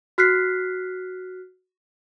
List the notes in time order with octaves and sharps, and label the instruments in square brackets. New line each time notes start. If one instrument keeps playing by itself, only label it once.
[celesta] F#4 F6 F#6 B6 C7